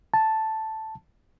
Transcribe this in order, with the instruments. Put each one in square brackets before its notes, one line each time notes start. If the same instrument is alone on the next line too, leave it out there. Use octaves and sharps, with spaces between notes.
[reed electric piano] A5